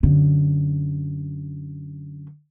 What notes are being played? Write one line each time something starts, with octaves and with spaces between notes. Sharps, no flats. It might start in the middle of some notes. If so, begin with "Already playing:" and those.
F#2 D3